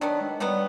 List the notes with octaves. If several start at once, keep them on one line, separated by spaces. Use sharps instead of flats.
D#3 F#3 B3 D4
G#3
D#3 F#3 G3 B3